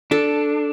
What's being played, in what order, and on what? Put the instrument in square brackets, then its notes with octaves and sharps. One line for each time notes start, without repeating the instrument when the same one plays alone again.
[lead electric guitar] D4 [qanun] A4